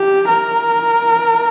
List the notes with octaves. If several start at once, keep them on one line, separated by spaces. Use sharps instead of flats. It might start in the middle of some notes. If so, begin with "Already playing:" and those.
Already playing: G4
A#4